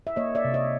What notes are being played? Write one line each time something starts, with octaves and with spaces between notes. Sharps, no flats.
E5
A#3 C#5 D#5
D5 E5
C3
C#5 D#5